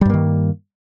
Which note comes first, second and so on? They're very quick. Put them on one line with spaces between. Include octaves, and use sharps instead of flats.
G3 G2 A#3 D#3